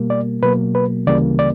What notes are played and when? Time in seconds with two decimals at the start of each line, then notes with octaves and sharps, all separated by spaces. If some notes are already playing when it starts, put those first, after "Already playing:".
Already playing: B2 G3 A#3
0.10 D5
0.43 B2 F#3 A#3 B4
0.75 B4
1.07 D2 C#3 E3 G3 A#3 D5
1.39 D5